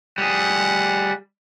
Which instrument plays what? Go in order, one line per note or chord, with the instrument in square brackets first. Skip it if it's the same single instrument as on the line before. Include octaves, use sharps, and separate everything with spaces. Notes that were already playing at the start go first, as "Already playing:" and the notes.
[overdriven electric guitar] G3 G#4 [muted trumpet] F#5